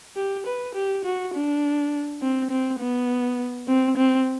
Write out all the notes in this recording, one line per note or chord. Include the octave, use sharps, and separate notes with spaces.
G4
B4
G4
F#4
D4
C4
C4
B3
C4
C4